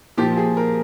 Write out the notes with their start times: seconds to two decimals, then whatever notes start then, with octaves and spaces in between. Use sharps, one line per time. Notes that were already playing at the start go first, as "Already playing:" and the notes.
0.17 A#2 F3 G4
0.37 G#4
0.57 A#4